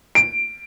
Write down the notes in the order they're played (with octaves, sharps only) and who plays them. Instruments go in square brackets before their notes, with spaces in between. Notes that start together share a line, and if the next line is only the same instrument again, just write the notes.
[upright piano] D7